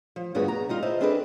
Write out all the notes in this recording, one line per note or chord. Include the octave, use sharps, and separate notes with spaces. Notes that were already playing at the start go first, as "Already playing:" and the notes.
F3
D2 G2 B3 F#4 G#4 B4
A#5
G3 D#4 F4
E4 C5 D#5 E5 A5
C4 D4 G#4 A4 B4 D5